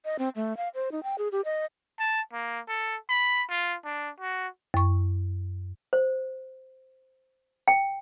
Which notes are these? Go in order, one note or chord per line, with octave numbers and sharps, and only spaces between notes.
D#5
C4
A3
F5
C5
D#4
G5
G#4
G4
D#5
A5
A#3
A4
B5
F4
D4
F#4
F#2 C#6
C5
G5